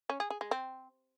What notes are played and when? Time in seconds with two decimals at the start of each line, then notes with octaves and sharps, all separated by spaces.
0.10 C#4
0.20 G#4
0.30 G#4
0.41 G#3
0.51 C4